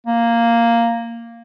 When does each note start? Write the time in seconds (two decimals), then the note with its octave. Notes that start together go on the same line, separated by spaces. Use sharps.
0.06 A#3